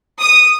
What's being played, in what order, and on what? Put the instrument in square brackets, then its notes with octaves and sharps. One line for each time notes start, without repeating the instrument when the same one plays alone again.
[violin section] D#6